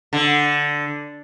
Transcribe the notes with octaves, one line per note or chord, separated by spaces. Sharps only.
D3